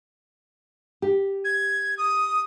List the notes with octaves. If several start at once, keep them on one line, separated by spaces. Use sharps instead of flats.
G4
G#6
D#6